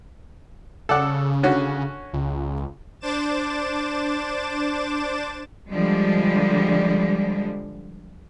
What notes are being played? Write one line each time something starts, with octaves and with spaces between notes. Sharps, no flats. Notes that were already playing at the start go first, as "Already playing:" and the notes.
C#3 A4 D5 F#5
D3 C#4 F#4
C#2
D4 C5 D6 A6 E7
D3 F3 G3 G#3